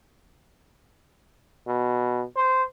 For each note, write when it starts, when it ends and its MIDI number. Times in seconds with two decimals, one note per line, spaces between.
1.67 2.24 47
2.36 2.63 72